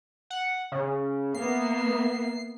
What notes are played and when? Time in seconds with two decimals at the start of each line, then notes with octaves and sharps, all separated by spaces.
0.30 F#5
0.72 C#3
1.35 A#3 B3 E5 C7